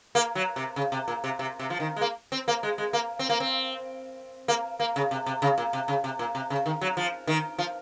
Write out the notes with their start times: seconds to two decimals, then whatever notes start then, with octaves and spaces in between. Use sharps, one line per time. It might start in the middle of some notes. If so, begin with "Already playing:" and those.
0.15 A#3
0.35 F#3
0.56 C3
0.76 C#3
0.92 C3
1.08 A#2
1.24 C3
1.39 C3
1.59 C3
1.70 F3
1.80 D#3
1.96 G#3
2.01 A#3
2.32 C4
2.48 A#3
2.63 G#3
2.78 G#3
2.93 A#3
3.19 C4
3.29 A#3
3.40 C4
4.48 A#3
4.80 A#3
4.96 C#3
5.11 C3
5.26 C3
5.42 C#3
5.58 A#2
5.73 C3
5.88 C#3
6.04 C3
6.19 A#2
6.35 C3
6.50 C#3
6.66 D#3
6.81 F#3
6.97 F3
7.27 D#3
7.58 F3